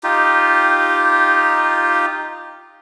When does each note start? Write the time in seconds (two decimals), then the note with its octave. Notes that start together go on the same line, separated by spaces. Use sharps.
0.03 D#4 F4 G4